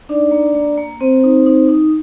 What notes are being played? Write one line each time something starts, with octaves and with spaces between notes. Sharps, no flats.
D4 D#4 D5
A#3
A#3
A#3
A#3 C4 C5
D#4
D#4
D#4